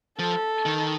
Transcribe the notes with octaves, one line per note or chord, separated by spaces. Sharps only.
F3 A4
D#3